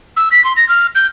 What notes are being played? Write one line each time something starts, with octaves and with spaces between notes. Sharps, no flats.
E6
B6
C6
A#6
F6
G6